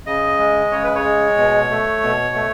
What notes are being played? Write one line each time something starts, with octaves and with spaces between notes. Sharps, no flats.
C#3 D#5
G#3
C#3 C#5
B4
C#5
G#3
B2
A3
B2
A3